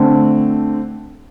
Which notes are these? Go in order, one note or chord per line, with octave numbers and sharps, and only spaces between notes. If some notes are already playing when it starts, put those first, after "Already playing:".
Already playing: D3 A3 C4